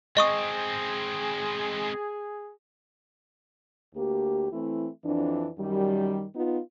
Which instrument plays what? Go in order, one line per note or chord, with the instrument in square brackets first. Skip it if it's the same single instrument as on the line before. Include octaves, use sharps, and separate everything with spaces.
[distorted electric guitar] G#3 C4 [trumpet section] G#4 [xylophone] D#5 C#6 D#6
[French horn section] D2 A#3 G4
E3 A3 C4 E4
F2 E3 D4
F#2 D#3 G3
B3 D#4 F4